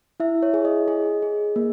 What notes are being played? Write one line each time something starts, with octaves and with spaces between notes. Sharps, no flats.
E4 E5
C#5
G#4
D#5
G#4
G#4
A#3